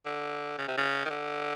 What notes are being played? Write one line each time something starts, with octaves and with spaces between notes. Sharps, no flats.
D3
C#3
C3
C#3
D#3
D3